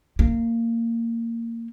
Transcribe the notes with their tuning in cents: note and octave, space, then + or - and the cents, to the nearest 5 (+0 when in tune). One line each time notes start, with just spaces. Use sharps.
A#3 -20